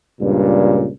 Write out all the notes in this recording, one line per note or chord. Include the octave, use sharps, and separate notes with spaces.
C#2 G2 A#2